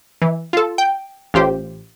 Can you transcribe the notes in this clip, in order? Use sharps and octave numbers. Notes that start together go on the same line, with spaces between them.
E3
F4 A4
G5
A1 F4 G4 C5